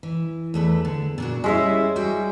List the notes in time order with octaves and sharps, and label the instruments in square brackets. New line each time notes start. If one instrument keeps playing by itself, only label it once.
[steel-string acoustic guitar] E3
E2 A3 B4
D3
A#2 D4 F#4
[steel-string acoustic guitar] G3 C#4 E4 [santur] G#3 E5
[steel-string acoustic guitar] G3 F#4 G5